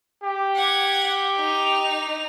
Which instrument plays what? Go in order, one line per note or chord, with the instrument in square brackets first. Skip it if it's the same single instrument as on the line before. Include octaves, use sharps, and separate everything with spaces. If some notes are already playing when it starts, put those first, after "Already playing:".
[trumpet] G4
[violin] F#5 G#6
D#4 F7